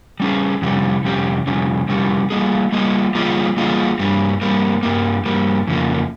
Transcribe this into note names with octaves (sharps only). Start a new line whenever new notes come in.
G3 C#4 G#4
F2 C3 G3 C#4 G4
F2 C3 G3 C#4 G4
F2 C3 G3 C#4 G4
F2 C3 G3 C#4 G4
G3 A#3 F4 G#4 D#5
G3 A#3 F4 G#4 D#5
G3 A#3 F4 G#4 D#5
G3 A#3 F4 G#4 D#5
G2 G3 A#3
G2 G3 A#3
G2 G3 A#3
G2 G3 A#3
F2 C#3 F3 A#3